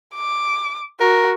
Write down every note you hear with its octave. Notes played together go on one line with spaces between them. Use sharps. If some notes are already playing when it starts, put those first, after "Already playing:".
D6
F#4 A#4